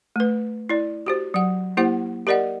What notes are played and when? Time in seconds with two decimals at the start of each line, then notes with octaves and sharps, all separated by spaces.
0.16 A3 B4
0.69 E4 D5
1.06 F#4 G4 C5
1.34 F#3 F#5
1.77 A#3 E4 G4 C5 F#5
2.27 G4 A#4 D5 D#5 F#5